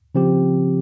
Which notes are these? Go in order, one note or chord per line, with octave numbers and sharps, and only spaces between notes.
C#3 F3 C4 G4